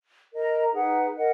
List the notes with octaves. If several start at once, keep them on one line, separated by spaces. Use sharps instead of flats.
A#4 D#5 A#5
D#4 G#4 B4 F#5
A#4 D#5 F#5